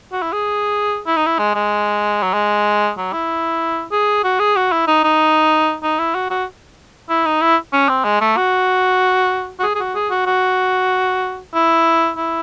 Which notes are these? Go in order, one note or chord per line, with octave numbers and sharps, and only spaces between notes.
F#4
E4
G#4
E4
D#4
E4
G#3
G#3
F#3
G#3
F#3
E4
G#4
F#4
G#4
F#4
E4
D#4
D#4
D#4
E4
F#4
F#4
E4
D#4
E4
C#4
C4
G#3
A3
F#4
F#4
G#4
G#4
F#4
G#4
F#4
F#4
E4
E4